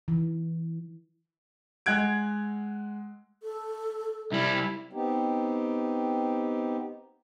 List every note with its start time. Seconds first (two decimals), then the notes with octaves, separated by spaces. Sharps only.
0.08 E3
1.86 G#3 F#5 F#6 G#6 D7
3.43 A4
4.32 C2 G3 E4
4.93 B3 C4 D#4 G4